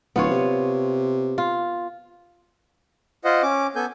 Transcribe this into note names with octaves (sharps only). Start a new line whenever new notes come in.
D1 B3 F4 C#5
C3
F4
F4 C5 D#5 F#5
C#4 D6
B3 A4 G#5 G6